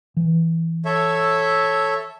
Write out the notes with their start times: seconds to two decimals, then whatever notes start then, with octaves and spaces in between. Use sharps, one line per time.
0.17 E3
0.85 A4 C#5 E5